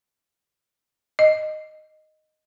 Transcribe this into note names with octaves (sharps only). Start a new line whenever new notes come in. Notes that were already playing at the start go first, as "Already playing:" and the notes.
D#5